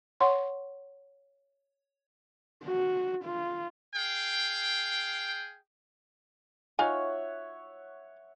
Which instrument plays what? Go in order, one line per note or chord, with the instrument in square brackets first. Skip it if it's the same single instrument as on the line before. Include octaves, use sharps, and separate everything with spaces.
[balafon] C#5 F#5 C6 C#6
[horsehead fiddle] F#4
F4
[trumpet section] G#4 F5 G5
[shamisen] D#4 F4 G#5 [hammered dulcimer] C#5 E5 F#5